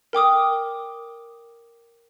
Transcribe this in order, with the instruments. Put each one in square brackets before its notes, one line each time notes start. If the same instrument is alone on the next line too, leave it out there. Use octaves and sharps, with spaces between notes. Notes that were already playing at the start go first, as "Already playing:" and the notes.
[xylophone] A#4 G5 D6 D#6